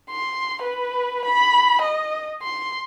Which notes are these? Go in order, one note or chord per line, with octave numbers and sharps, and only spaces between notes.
C6
B4
B5
D#5
C6